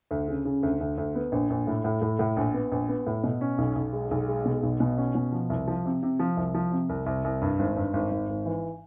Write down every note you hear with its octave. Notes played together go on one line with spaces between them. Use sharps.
D2
C#3
C#3
D2
D2
D2
B3
A#1
A#1
A2
A2
A2
A2
A#1
B3
A#1
B3
A2
B2
C#4
B1
B1
G#3
B1
G#3
B2
B1
B2
C#4
B2
F3
C2
F3
C3
C3
F3
C2
F3
C3
C2
C2
C2
G2
G#1
G2
G#1
G#1
G#1
E3